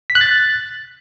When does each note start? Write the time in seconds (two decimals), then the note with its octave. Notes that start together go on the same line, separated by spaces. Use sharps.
0.10 B6
0.15 F#6
0.21 A6